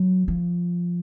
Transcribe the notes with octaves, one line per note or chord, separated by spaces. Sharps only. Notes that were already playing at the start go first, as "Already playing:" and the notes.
Already playing: F#3
F3